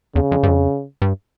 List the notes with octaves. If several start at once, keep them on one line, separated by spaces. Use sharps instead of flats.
E2 C#3
F2
G2
F2
G2